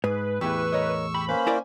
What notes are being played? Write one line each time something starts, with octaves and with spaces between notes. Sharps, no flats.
G#2 G#4 B4
E2 A2 E4 G4 C#6 E6
A#4 C#5 D#5
G4 B5
A#3 C#4 B4 C5
E4 A#4 D5 G#5